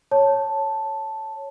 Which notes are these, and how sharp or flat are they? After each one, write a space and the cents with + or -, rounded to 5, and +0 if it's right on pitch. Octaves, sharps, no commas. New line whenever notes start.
C#5 +0 A5 +0